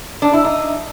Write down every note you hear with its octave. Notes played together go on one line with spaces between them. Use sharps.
D4
E4
D#4